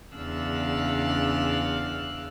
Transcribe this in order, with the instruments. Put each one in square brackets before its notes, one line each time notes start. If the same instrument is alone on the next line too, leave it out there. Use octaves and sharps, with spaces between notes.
[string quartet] E2 C#3 D4 F5 E6 F#6